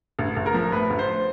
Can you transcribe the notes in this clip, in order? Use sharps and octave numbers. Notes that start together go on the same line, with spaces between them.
A1
A1
A#4
F3
A2 B4
A1
C5